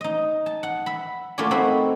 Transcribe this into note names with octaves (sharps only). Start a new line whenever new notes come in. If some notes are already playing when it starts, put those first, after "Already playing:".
D#4 D#5
A5
F#5
E5 B5
A3 A#3 F4 F#4 G#4 D5
C4 D#4 F#4 C5 E5 B5